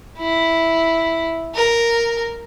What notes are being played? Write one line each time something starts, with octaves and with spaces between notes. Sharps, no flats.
E4
A#4